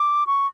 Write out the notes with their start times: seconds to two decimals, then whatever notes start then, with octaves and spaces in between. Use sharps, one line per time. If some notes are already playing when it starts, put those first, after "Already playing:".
Already playing: D6
0.27 C#6